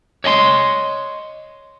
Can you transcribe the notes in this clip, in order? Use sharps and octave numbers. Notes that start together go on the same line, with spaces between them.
C#5 D#5 G#5 C6